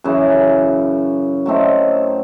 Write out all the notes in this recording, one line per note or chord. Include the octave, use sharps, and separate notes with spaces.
F#2 C#3 E3
F#3 A3 C4 D#4